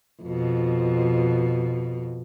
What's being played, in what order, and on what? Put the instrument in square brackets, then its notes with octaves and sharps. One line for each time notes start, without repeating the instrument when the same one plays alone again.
[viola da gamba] F2 B2